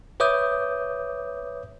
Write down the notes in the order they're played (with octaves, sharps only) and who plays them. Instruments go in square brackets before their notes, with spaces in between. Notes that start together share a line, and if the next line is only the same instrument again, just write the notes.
[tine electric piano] B4 C#5 E5 D6 D#6 G6